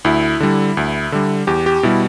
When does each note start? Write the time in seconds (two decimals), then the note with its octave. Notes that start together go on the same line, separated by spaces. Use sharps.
0.05 D2 E4
0.40 D3 G3
0.77 D2
1.12 D3 G3
1.47 E2 G4
1.66 G4
1.83 B2 G3 E4